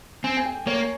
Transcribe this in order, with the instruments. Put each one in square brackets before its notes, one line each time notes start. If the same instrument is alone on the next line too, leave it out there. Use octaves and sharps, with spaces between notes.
[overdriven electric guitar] C4 [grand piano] G#5
[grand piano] G#5
G5
[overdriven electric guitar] A#3 [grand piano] C#5